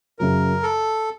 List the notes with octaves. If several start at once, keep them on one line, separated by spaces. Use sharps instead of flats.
F#2 C#3 F#3 A#4
A4